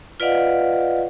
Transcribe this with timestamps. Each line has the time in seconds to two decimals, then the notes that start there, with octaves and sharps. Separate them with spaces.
0.20 F4 B4 D5 D#5 F5 F#5